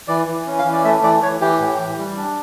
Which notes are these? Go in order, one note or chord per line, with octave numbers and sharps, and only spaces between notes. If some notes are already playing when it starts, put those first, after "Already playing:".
E3 D5
E3
C#4
F5
E3
D5
A3 E5
E3 D5
E3 C#5
E3 G4
A2
E3
G3
D4